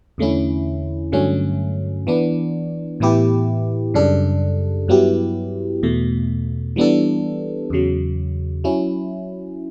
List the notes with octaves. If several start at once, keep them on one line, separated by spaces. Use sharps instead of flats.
E2 D3 A3 C#4 E4
G2 D3 F#3 A3 C#4
E3 B3 D4
A2 E3 B3 E4 G4
F#2 C#3 G3 D4 A4
G2 F#3 B3 E4 G4
E2 B2 A3
E3 G3 B3 D4 A4
E2 C#3 F#3
F#3 C#4 E4